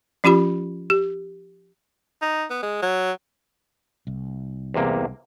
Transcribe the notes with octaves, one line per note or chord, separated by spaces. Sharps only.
F3 C#4 F4 G4 B5
G4
D#4
B3
G#3
F#3
C2
E2 C3 A#3